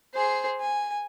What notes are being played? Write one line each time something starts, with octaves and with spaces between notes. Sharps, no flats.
G#4 C5
G#5